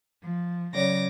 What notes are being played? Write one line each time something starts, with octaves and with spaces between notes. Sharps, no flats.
F3
C#3 F#3 C#5 D5 D6 A#6